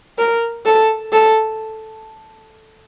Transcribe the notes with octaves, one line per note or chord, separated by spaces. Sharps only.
A#4
A4
A4